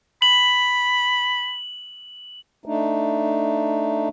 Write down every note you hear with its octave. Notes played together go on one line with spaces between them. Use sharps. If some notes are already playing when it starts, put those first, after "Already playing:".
B5 F#7
A3 D4 D#4